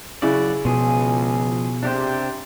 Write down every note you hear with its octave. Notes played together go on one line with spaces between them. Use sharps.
C#3 F#3 E4 F#4 D5
C#2 B2 F3 G#4
C3 D4 G4 C5